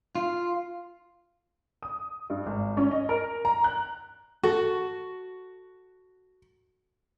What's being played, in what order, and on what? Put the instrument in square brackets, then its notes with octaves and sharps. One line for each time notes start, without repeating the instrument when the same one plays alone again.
[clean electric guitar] F4
[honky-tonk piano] D#6
G2
G#1
C#4
D#5
A#4
A#5
F#6
[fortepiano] F#4 [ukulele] A4